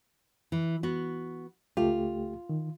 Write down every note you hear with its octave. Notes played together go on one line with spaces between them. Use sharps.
E3
B3 F#4
C#2 A3 F4 G4
D#3